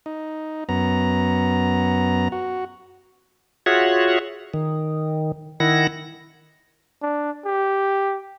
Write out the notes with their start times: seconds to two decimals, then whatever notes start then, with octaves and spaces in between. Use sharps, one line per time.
0.06 D#4
0.69 F#2 B3 A#5
2.32 F#4
3.66 F4 F#4 G#4 C#5 E5 F#5
4.54 D#3
5.60 D#3 E4 F#5 A#6
7.02 D4
7.46 G4